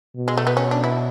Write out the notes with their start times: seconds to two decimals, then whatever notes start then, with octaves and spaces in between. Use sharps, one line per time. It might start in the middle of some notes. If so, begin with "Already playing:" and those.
0.16 B2
0.28 G#3
0.37 A3
0.47 B3
0.57 C#4
0.71 D4
0.84 E4